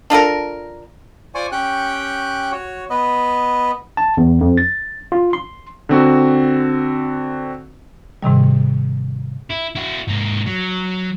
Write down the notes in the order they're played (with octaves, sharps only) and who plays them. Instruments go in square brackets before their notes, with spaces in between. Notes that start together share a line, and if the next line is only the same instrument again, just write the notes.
[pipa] D4 F4 A4 A#4
[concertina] F4 C5 D5 G#5 C#6
C#4 G4 G5 C#6 F#6
F#4 C#5
B3 B4 D#5
[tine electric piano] A5
E2
F2
A6
F4
C6
[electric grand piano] D3 C4 F#4
[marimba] G#2 C3 D#3 G3
[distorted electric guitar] E4
E4 F#4
G#2 A#3
F#3